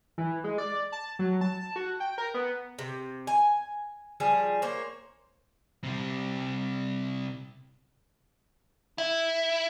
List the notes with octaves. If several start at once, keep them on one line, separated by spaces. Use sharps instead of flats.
E3
G#3
D5
A5
F#3
A5
F#4
G5
A#4
B3
C3
G#5
F3 G3 G#4
A#3 C5 C#5
C3 G3
E4